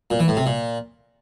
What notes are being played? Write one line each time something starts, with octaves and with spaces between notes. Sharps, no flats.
A#2
E3
A2
C3
A#2